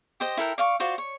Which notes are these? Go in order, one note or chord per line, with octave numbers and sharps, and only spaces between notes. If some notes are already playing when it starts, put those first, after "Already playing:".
G4 C5 D#5
E4 A4 A#4 G5
D5 F5 C#6
F4 F#4 C5 D5
C#5